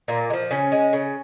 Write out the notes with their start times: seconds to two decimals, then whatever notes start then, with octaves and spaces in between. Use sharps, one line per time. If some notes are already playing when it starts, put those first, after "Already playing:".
0.08 A#2 A#3
0.30 G#3
0.33 F3
0.51 C#3 C#4
0.72 G#3
0.93 C#3